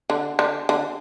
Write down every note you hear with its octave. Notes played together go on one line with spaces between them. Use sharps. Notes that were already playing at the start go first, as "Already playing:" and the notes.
D3
D3
D3